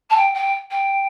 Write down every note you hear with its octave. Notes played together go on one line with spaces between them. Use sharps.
A5
G5
G5
G5